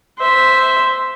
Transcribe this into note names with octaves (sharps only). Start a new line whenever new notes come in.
C5 E5